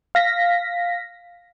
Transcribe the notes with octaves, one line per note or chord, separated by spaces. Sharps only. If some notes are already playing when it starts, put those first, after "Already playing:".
F5 A#6 B6